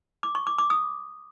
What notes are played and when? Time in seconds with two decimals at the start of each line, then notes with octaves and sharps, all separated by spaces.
0.23 D6
0.35 C#6
0.47 D6
0.58 D6
0.70 D#6